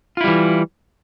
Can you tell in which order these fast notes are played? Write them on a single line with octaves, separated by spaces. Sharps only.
F4 E4 G3 E3